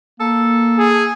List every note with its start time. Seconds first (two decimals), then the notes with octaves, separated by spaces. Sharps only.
0.20 A#3 A4
0.78 G#4